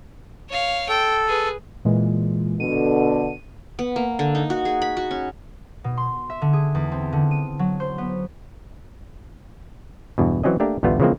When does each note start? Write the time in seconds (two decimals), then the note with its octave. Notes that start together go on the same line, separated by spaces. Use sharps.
0.49 C#5 F5
0.89 A4 G5
1.27 G#4 B4
1.85 A#2 E3 G#3
2.60 B2 D3 D#7
3.79 B3
3.96 A#3
4.19 D3
4.35 D#4
4.50 F#4
4.65 G#4
4.82 B5
4.97 F#4
5.11 C#4
5.84 B2
5.97 C6
6.30 E5
6.42 D3
6.53 G#4
6.75 E2
6.92 C4
7.13 D3
7.31 D#7
7.59 F#3
7.80 C5
7.98 B3
10.18 E2 G2 B2
10.43 E3 F#3 C4 C#4 D#5
10.60 A3 A#3 D4 G4 A#4
10.83 A1 D2 G3 A3 B3 F4
11.00 C#3 E3 F3 G#3 A#3 C4